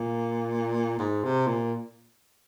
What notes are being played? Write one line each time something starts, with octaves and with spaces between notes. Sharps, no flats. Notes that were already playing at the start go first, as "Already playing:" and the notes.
Already playing: A#2
G#2
C3
A#2